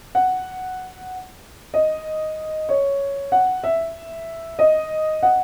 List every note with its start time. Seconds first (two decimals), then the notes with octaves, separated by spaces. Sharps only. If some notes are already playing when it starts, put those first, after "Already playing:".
0.15 F#5
1.74 D#5
2.69 C#5
3.32 F#5
3.64 E5
4.59 D#5
5.23 F#5